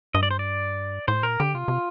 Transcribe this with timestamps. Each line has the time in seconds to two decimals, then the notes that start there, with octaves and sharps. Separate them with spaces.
0.14 G2 D#5
0.23 D5
0.31 C5
0.39 D5
1.08 A2 C5
1.23 A#2 A#4
1.40 D3 G4
1.54 C3 F4
1.68 C3